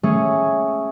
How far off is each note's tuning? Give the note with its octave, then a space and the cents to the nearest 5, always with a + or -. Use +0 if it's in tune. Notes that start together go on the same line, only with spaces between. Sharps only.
A3 +0 C#4 +0 G#4 +0